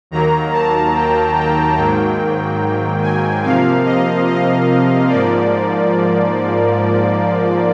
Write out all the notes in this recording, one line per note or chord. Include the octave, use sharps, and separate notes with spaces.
D#2 D#3 F#3 A#3 A#5
A5
G5
G5
G#2 D#3 F#3 A#3 G5
G#5
C3 F3 A#3 F5
D#5
D#5
G#2 F3 A#3 D5